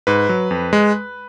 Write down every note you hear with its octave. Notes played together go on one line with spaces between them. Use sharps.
G#2 B4
F#3
F2
G#3